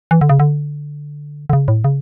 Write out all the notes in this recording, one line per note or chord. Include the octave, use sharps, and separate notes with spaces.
E3
D3
C#3
D3
D3
C#3
A2
C#3